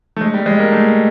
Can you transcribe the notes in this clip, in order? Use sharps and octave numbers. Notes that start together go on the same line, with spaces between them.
A3
G#3
G3
G#3
A#3
A3